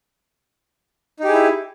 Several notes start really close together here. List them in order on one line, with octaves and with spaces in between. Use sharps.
D#4 G4 G#4 E4